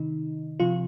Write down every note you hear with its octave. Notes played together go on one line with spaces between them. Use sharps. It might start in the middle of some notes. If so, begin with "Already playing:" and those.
Already playing: C3 D#3 D#4
C3 F3 F4